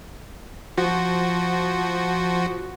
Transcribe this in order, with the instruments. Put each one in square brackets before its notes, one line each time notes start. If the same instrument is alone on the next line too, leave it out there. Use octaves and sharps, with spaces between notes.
[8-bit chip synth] F3 F#4